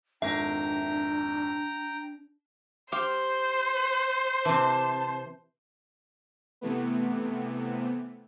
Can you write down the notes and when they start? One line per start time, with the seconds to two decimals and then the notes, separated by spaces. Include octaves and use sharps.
0.22 G#1 F2 D4 E5 G5 A#5 A#6
2.92 G4 C5 F5 G5
4.45 C3 E3 A5
6.61 C3 E3 A3 B3